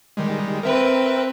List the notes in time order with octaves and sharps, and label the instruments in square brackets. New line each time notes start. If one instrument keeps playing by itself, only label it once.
[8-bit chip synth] D#3 G3 G#3
[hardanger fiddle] C4 B4 [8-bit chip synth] A#4 E5 G5